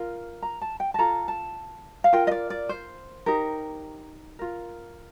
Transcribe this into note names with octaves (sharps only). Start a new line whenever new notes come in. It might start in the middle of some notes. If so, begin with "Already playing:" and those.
Already playing: F4 A#4
A#5
A5
G5
A5
F4 A4 A#5
A5
F5
F4 A#4 G5
D#5
D5
D5
C5
D#4 G4 A#4
F4 A#4